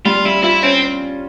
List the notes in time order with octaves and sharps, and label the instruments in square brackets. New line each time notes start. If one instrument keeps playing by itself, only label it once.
[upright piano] G3 [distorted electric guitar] F4
[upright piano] G3 [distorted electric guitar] E4
[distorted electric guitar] E4 [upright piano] F4
[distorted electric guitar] C4 [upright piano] C#4